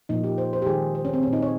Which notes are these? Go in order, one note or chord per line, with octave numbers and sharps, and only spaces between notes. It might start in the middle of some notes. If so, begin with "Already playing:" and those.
A#2 F3 A#3 D#4
G4
C5
C5
G4
D#3 G#3 G#4
C5
C#4
C4
A#2 G#3 C#4
D#4
C#5